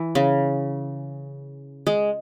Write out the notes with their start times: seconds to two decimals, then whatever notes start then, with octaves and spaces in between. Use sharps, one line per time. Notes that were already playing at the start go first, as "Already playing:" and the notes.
Already playing: E3
0.15 C#3
1.87 G#3